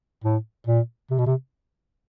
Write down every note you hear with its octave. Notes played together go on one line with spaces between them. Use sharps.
A2
A#2
C3
B2
C3